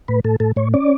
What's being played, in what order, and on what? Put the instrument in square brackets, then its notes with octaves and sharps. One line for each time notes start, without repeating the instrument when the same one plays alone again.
[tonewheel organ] A2 B4
A2 A4
A2 A4
A2 C#5
C#4 D5